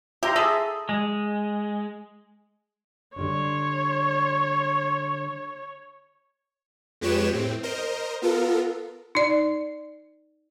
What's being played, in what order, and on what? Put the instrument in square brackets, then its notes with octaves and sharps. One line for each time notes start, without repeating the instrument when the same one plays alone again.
[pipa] G4 [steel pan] E5 A#5 C6
[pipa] G#4 A4 [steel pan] E5
[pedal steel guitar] G#3
[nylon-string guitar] D3 G3 D4 [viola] C#5 [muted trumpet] C6
[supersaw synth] F2 G#3 G4 B4 C#5 E7
A2 C4
A#4 C5 D#5
B3 F4 A4 A#4
[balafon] D#4 D5